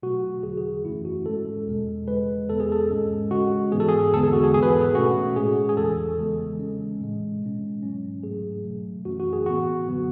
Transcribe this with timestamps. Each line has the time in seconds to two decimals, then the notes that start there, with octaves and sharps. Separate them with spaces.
0.03 B2 F#3 A3 F#4
0.43 E2 D3 F#3 G#4
0.58 G#4
0.84 F#2 E3 A3 C#4 E4
1.05 F#4
1.26 G#2 G#3 C#4 A4
1.67 E2 B2 G#3
2.08 E2 C#3 G#3 B4
2.49 E2 B2 G#3 B3 A4
2.60 G#4
2.72 A4
2.90 G#2 G#3 C#4
3.31 C#3 G#3 C#4 F#4
3.72 G#2 E3 B3 G#4
3.80 A4
3.88 G#4
4.14 E2 D3 G#3 B3 A4
4.23 G#4
4.33 F#4
4.44 G#4
4.54 G#2 E3 B3 G#4
4.63 B4
4.68 A4
4.81 G#4
4.95 B2 A3 C#4 F#4
5.36 A2 G#3 C#4 G#4
5.69 G#4
5.77 E2 C#3 E3 A4
6.18 C#3 E3 G#3 B3
6.59 C#3 G#3 C#4
7.00 A2 E3 G#3
7.42 B2 G#3 C#4
7.82 G#2 F#3 C#4
8.23 G#2 F#3 A3 G#4
8.64 B2 F#3 A3
9.05 F#2 E3 A3 C#4 F#4
9.20 F#4
9.33 G#4
9.46 A2 E3 B3 F#4
9.87 F#2 D3 F#3 B3